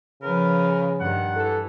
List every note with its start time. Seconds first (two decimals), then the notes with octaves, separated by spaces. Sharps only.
0.22 C#3 F3 A#4 B4
1.00 G2 D#3 F#5
1.36 E3 A4